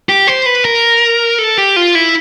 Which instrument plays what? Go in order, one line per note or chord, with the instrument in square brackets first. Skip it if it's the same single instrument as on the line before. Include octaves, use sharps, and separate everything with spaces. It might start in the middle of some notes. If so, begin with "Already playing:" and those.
[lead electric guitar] G4
C5
B4
A#4
A4
G4
F4
E4